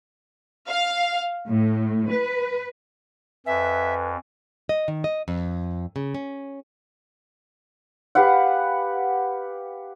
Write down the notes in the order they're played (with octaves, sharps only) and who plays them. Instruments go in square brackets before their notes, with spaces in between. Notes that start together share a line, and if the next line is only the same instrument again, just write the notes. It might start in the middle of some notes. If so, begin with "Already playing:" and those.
[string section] F5
A2
B4
[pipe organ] F2 [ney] B4 [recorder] E5 [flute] G#5
[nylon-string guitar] D#5
D#3
D#5
F2
C#3
C#4
[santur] G4 B4 F5 F#5